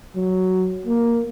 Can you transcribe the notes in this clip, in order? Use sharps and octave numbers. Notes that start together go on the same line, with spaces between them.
F#3
A#3